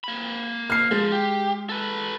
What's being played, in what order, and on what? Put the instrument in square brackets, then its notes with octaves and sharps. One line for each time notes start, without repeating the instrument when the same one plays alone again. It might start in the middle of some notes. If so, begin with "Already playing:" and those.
[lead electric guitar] A#3 B5
[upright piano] F6 C7
[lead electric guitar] F3 [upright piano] G#3
[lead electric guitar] G4
A4 B4